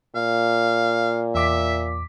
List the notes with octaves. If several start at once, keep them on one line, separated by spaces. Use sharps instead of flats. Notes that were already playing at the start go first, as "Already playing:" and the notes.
A#2 F5
E2 E5 D6 B6